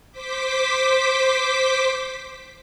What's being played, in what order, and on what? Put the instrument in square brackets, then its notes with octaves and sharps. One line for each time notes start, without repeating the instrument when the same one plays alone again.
[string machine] C5 D6 B6